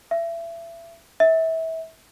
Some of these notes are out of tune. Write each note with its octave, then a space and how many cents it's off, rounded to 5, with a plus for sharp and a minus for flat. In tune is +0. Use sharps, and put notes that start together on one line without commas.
E5 +30
E5 -25